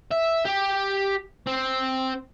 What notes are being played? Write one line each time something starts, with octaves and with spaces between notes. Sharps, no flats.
E5
G4
C4